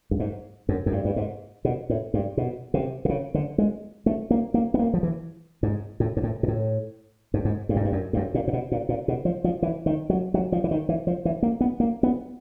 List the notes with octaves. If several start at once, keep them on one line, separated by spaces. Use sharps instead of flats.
G2
G#2
F#2
F#2
G2
G2
G#2
B2
A2
G2
B2
C3
C3
C#3
D3
G#3
A3
A#3
A#3
B3
A#3
F3
E3
G#2
A2
G#2
A2
A#2
A2
G2
G#2
G2
G#2
G2
F#2
G2
F#2
A#2
A#2
B2
A#2
A#2
B2
F3
F3
E3
D#3
F#3
F#3
F3
E3
D#3
E3
F3
E3
A#3
B3
A#3
B3